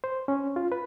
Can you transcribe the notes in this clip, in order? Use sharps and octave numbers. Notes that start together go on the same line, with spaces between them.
C5
C#4
F4
B4